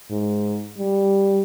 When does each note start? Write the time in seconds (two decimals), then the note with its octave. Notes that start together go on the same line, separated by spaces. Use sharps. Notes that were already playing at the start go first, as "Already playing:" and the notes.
0.10 G#2
0.78 G3